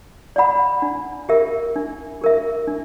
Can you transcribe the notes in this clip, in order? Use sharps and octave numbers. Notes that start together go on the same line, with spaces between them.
D5 F#5 B5
D4
G4 A#4 E5
D4
G4 A#4 E5
D4